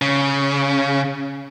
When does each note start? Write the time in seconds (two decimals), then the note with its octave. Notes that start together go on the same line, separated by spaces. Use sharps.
0.02 C#3